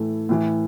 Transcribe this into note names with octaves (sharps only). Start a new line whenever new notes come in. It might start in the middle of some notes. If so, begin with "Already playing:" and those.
Already playing: A2 E3 A3
A2 E3